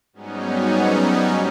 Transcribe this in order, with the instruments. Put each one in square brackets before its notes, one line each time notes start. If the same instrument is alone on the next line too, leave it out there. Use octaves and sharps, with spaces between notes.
[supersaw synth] G#2 F#3 G3 B3 C#4 D#4